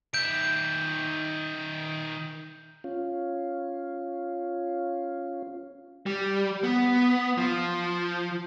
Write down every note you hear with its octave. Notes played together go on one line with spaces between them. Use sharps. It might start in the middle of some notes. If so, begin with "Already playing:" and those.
D#3 E5 G6 D7
C#4 F4
G3
B3
F3